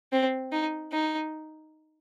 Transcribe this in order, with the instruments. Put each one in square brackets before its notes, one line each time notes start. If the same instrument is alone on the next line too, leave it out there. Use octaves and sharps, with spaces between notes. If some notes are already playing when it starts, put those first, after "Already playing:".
[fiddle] C4
D#4
D#4